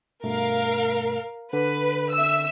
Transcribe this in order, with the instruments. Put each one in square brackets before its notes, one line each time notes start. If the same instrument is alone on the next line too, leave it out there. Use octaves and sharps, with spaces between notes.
[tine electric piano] G2 B2 A3 [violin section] A#4 F5
[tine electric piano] D3 [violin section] B4
[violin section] E5 E6